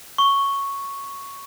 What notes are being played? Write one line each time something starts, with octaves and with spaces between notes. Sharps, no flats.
C#6